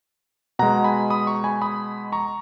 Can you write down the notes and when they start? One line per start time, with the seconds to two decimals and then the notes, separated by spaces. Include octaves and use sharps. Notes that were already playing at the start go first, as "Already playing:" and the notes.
0.59 B2 G#3 F#5 A#5
0.84 G#5 B5
1.10 B5 D#6
1.27 A#5 C#6
1.44 G#5 B5
1.62 B5 D#6
2.12 A#5 C#6